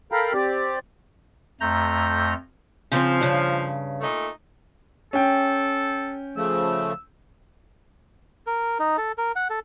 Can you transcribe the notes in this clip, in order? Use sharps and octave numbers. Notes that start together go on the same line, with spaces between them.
A4 A#4 F5 G5 A#5 B5
C4 G4 D5
F2 A3 A#5 G6
C#3 F3 C4
G2 C#3
A#2 A3 D#4
C#4 A4 G5
C#3 F3 A3 E6
A#4
D#4
A4
A#4
F#5
A4